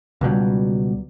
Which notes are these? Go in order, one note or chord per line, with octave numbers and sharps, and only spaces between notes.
C#2 B2 F#3 G3